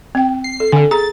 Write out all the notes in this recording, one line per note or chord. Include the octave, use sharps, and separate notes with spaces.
C4 G5
C7
A4
D3 A4 G#5
G#4 A#5 A6